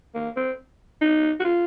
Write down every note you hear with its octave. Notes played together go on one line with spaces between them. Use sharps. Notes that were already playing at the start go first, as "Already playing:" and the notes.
A#3
C4
D#4
F#4
F4